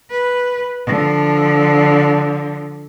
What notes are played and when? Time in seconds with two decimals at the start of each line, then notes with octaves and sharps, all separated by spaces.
0.10 B4
0.86 D3 F3